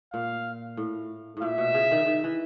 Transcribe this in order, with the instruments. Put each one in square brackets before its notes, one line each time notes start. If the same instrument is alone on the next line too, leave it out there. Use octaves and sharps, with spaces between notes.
[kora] A#2 [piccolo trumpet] F5
[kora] A2
A2
[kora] A#2 [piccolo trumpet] E5
[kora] B2
C#3
D#3
D#3
E3